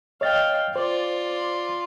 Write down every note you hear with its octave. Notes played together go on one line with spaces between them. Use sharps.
C#5 D#5 F5 G5 A6
F4 C5 D5